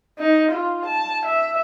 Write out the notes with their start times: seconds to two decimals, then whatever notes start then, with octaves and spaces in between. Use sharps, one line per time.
0.19 D#4
0.51 F4
0.85 A5
1.25 E5